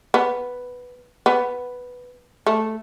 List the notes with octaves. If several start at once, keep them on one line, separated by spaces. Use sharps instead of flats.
B3
B3
A3